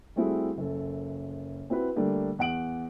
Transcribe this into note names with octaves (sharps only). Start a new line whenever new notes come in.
G3 A3 C4 E4 F#4 G#4
F#1 F#2 A4
C4 E4 F#4 B4
D3 G3 A3 A#3 D4
E2 F#5 D7 F#7